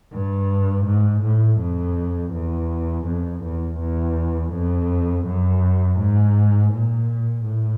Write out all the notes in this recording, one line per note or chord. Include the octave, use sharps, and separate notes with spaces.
G2
G#2
A2
F2
E2
F2
E2
E2
F2
F#2
G#2
A#2
A2